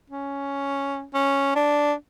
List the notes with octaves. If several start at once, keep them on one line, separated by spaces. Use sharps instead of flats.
C#4
C#4
D4